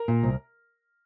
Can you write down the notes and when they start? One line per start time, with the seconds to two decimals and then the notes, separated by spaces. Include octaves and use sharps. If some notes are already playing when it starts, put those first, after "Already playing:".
Already playing: A#4
0.08 A#2
0.23 C2